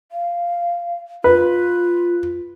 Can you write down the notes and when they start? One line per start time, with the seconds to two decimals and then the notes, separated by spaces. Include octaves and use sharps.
0.12 F5
1.24 F4 B4